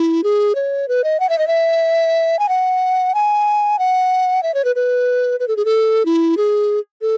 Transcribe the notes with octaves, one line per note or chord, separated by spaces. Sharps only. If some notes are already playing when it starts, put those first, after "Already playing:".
Already playing: E4
G#4
C#5
B4
D#5
F#5
E5
D#5
E5
G#5
F#5
G#5
F#5
E5
C#5
B4
B4
B4
A4
G#4
A4
E4
G#4
A4